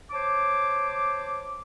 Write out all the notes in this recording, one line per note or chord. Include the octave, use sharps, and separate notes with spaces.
C5 C#5 A5 D6